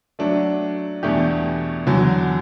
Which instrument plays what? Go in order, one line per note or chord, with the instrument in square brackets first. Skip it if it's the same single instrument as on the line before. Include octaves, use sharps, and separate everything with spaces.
[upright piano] F#3 A3 D4
E2 B2 A3 D4 G4
E2 D3 F#3